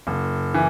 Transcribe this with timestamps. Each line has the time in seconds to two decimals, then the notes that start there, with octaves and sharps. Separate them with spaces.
0.07 F#1
0.54 E3